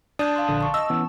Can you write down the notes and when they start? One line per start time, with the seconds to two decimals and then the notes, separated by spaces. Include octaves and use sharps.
0.19 D4 D5 A5 D#6 G6
0.36 F5 C6
0.48 A#1 D3 D#6
0.61 A5 C#6
0.74 D#5 E6
0.90 E3 B3 C#4